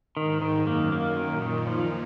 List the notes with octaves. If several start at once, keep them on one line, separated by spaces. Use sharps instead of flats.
G#2 D#3
D#3
F#2
A#3
F#2 A#3
D#3
A#2
D#3
F3